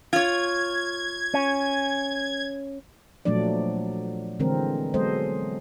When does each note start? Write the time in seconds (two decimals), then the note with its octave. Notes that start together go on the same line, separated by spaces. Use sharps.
0.13 F4 C#5 G#6
1.34 C#4
3.25 A#2 F3 F#3 A3 D4 D5
4.40 D3 E3 G#3 C4 A#4
4.94 F#3 G#3 B3 A4 C5 D#5